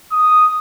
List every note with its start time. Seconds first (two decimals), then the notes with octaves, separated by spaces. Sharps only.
0.11 D#6